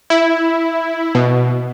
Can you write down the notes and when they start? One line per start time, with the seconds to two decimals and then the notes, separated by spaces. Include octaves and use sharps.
0.10 E4
1.15 B2